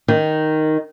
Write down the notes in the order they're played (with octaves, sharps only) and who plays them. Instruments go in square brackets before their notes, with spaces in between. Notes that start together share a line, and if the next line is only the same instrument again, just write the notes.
[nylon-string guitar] D#3